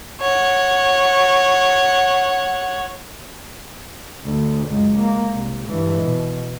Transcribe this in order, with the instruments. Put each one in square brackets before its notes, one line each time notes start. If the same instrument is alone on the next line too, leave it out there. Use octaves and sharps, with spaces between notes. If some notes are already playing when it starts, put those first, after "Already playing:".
[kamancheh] C#5 F#5
[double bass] D2
C#2 F#2
A#3
C2
G2 E3
B2